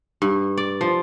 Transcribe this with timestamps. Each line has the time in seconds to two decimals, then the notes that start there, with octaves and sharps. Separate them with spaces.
0.22 G2
0.57 D5
0.81 F3